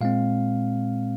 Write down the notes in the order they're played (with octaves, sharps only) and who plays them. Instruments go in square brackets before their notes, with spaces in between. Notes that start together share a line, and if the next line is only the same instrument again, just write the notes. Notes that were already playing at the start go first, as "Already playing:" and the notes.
[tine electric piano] A#2 G#3 C4 F5